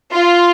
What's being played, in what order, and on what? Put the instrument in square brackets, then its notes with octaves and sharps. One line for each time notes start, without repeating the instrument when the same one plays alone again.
[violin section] F4